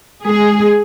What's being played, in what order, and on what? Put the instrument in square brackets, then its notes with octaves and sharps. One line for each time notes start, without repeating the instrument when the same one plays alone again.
[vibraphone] G#3 [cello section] G#4